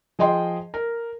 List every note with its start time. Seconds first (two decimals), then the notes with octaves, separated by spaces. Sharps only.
0.19 F3 G#4 D#5 G5 C6
0.74 A#4